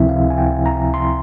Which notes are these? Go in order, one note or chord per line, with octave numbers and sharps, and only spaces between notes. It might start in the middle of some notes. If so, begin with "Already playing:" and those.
Already playing: C#2 C3 F3 C4 E4 E5
F5
G#5
G5
A#5
C6